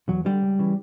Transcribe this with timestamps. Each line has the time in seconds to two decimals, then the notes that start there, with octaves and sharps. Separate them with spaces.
0.08 E2 F#3
0.25 D3 G3
0.42 C#2
0.59 C#3 E3